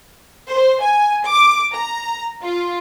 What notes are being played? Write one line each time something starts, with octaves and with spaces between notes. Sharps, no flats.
C5
G#5
D6
A#5
F4